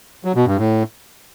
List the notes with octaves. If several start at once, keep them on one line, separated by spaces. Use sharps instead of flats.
F#3
B2
G2
A2